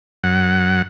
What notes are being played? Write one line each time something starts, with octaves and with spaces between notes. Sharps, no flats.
F#2 F#5